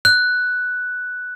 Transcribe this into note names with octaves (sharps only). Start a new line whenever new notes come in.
F#6